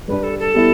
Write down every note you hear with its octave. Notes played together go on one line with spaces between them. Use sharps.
G2 G3 D4 B4
A4
A4
G3 B3 E4